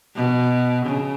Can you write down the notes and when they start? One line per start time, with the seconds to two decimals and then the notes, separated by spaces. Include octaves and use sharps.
0.15 B2
0.86 C#3